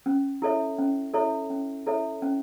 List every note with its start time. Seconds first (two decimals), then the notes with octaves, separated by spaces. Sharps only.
0.06 C#4
0.42 E4 A4 C#5 E5
0.79 C#4
1.13 E4 A4 C#5 E5
1.50 C#4
1.86 E4 A4 C#5 E5
2.22 C#4